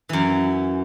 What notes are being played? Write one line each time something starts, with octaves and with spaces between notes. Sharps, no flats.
F#2 E3